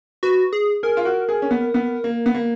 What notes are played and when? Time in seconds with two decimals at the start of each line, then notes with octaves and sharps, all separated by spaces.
0.23 F#4 B4
0.53 G#4
0.83 G#4 A#4
0.97 F4
1.05 F#4
1.29 G#4
1.42 C#4
1.51 B3
1.74 B3
2.04 A#3
2.26 B3
2.35 A#3